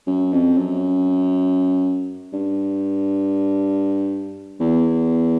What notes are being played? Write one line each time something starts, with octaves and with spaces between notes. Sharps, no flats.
F#2
F2
F#2
G2
E2